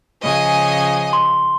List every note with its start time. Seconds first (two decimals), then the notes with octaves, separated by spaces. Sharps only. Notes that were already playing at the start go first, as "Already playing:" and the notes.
0.22 C#3 F3 D#5 G#5
1.13 C6